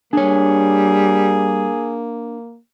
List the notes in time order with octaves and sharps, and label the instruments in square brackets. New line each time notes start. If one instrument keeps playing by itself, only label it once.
[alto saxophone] G3 [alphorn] A#3 [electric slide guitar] D4 C#5 [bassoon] G#4